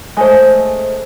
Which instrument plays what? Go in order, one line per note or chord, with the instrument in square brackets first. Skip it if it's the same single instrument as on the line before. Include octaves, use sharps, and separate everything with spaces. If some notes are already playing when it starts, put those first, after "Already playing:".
[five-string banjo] G#3 A3 C5